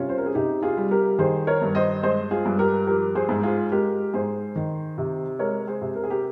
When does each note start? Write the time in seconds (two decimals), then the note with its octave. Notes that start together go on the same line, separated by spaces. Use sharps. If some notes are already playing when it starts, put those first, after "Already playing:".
Already playing: C3 G3 C#4 F4
0.09 C5
0.18 A#4
0.26 G#4
0.35 C3 D#4 G4
0.62 F4 G#4
0.77 G3
0.91 G4 A#4
1.19 D#3 G#4 C5
1.47 A#4 C#5
1.61 G2
1.75 C5 D#5
2.03 G#3 C5 D#5
2.31 F4 G#4
2.46 G2
2.59 G4 A#4
2.87 F3 G4 A#4
3.15 G#4 C5
3.29 G#2
3.43 F4 G#4
3.72 G#3 G4 A#4
4.13 G#2 G#4 C5
4.56 D#3
4.98 C3
5.39 G#3 A#4 C#5
5.67 G#4 C5
5.81 C3
5.96 A#4
6.03 G#4
6.10 G4 A#4